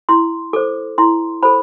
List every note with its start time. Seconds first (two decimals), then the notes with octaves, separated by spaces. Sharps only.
0.09 E4 C6
0.53 A4 C5 D6
0.98 E4 C6
1.43 A4 C5 B5